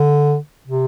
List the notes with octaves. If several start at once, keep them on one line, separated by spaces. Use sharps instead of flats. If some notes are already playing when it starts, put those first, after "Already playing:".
Already playing: D3
C3